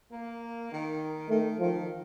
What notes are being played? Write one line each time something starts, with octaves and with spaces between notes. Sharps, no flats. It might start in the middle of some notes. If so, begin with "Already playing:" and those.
A#3
D#3
D#3 A3
D#3 F3